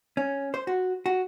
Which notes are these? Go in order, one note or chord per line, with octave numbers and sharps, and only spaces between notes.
C#4
C5
F#4
F#4